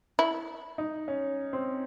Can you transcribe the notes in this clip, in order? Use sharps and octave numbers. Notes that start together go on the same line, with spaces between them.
E4
D#4
C#4
C4